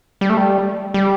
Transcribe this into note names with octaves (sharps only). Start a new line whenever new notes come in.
G3
A3
G3
G3